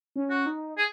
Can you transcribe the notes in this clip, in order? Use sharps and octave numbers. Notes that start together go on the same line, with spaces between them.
C#4
F#4
D#4
G#4